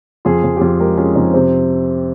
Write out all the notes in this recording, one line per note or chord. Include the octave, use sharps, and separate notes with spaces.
F2 F4 G#4
F2
G4
F2 F4 G#4
G#3 G4 A#4
G#3 C#4 F4
F2 C4 D#4
C3 C4